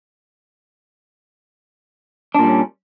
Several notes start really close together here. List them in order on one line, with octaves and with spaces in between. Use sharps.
D4 A#2 G3 C#4